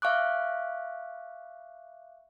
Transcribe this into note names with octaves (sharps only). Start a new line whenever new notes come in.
E5 F5 C#6 D6 F#6